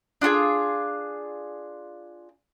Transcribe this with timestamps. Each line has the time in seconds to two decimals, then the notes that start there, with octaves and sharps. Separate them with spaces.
0.21 D4 F4 F#4 G#4